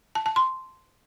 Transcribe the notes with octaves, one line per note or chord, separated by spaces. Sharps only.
A5
A5
C6